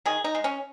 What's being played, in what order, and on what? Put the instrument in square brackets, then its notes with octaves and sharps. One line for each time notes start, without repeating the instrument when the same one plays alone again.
[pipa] D#3 G#4
D#4
G#3
C#4